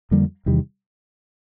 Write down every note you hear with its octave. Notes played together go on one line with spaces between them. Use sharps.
F2 D3 G3 A#3
E2 C3 D#3 G3